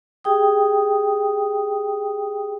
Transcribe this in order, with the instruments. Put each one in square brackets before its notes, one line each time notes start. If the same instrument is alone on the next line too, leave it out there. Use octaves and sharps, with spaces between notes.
[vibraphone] G4 G#4 G5 D#6